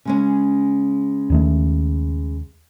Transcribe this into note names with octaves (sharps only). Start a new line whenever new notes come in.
C#3 G#3 C#4
D#2 D#3 A3